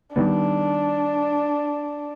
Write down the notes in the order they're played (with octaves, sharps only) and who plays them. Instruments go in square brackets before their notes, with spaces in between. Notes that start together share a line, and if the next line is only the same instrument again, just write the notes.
[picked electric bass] D#3 G3 B3 [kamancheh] D4